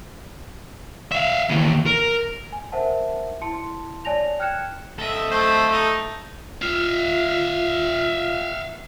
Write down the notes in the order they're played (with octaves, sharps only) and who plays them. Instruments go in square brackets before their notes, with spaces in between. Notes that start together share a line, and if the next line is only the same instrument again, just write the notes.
[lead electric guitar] E5 F5
D#2 E3
A#4
[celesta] G#5
A#4 C5 E5 F#5 A5
E4 A5 C6 C#7
C#5 D5 G#5 A5 A#6 F7
G5 F6 F#6 G#6 C#7 E7
[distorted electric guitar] A4 D#5 [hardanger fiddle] E5
[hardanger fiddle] A3 [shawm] C5
[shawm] D#4
[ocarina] F4 [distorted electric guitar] E5 F5